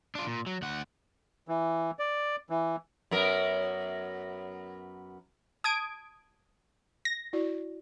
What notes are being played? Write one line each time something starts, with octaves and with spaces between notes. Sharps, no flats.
D4 F4
A#2
F#3
D2 F#5
E3
D5
E3
F#2 B3 A#4
A5 D#6 G#6 D7
A#6
E4 F#4 D5